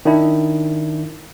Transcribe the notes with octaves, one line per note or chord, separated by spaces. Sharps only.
D#3 D4 E4